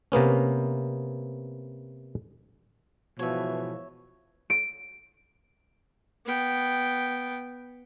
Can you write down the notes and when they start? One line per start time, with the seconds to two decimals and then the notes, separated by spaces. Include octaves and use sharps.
0.12 C3 A#3 B3 C#4
3.19 G#2 B2 E3 F3 C#5 E5
4.50 D7
6.26 B3 G5